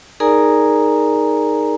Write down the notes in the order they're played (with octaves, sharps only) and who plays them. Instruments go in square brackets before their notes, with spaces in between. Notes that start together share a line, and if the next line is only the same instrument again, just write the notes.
[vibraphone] D#4 G#4 A#4 D5 G#5 A#5